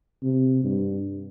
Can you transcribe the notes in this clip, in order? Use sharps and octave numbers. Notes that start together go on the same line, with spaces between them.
C3
G2